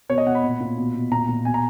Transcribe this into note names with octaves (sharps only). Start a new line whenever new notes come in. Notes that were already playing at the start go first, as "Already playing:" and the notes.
B2 C#5
D#5
B2 F#5
B5
A#2
A#2
B2
B2
A#2 A#5
A#2
B2 G#5
A#5